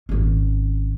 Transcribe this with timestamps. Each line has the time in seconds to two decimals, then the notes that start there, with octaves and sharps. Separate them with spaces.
0.09 G#1 C#4